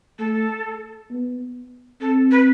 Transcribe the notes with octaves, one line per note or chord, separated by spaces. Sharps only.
A3 A4
B3
C4 A4
B4